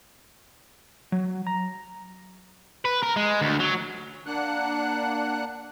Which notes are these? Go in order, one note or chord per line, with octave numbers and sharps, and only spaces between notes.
F#3
A#5
B4
A#4
G#3
D2
F#3
A#3 D4 F#5 F#6